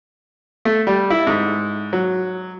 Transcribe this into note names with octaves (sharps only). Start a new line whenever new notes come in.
A3
G3
E4
G#2
F#3